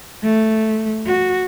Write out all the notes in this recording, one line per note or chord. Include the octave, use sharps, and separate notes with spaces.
A3
F#4